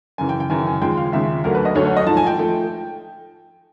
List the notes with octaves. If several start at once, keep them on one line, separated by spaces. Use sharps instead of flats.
F#2 C#3 E3 G#5
G5
G5
F#2 C#3 E3 G#5
G#5
D#2 C#3 F3 G#3 G5
F5
D#2 C#3 F3 G#3 E5
D2 D3 F#3 A3 A#4
B4
D#5
D2 D3 F#3 A3 C#5
C#5
D#5
G#2 F3 A3 A5
G#5
G5
F3 A3